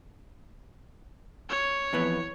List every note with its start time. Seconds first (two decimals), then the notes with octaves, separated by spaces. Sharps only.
1.49 C#5
1.93 F2 E3 B3